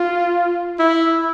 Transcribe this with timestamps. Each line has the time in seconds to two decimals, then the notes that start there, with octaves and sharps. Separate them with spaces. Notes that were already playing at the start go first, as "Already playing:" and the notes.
Already playing: F4
0.79 E4